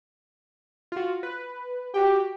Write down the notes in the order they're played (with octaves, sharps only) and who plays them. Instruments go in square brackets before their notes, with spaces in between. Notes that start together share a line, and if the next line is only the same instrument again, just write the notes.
[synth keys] F4 F#4
B4
[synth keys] F#4 G5 [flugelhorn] G4